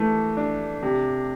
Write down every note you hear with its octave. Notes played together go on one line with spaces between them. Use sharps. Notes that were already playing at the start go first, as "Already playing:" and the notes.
Already playing: E3 A3
D4
C3